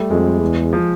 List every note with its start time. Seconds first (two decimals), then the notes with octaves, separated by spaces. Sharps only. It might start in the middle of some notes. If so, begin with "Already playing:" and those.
Already playing: G3 A3
0.10 F2 G#3
0.41 E2
0.73 F3